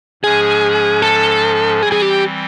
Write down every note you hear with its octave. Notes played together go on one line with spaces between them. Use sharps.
G#2 F3 G#3 C#4 G#4
A4
E3 G3 C4 G#4
G#4
G4